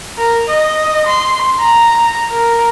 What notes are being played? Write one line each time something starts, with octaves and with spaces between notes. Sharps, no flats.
A#4
D#5
C6
A#5
A#4